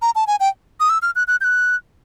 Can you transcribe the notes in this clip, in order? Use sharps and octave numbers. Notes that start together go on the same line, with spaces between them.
A#5
A5
G#5
G5
D#6
E6
F6
F#6
F#6
G6
F#6